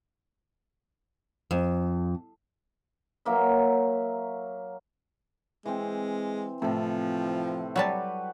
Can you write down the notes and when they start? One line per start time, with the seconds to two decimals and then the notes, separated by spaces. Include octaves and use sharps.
1.51 F2
3.25 F#3 A#3 E5
5.65 E3 G#3 C4
6.62 A2 C3 F3 A4
7.76 F#3 G3 F#4 G4 B4 A5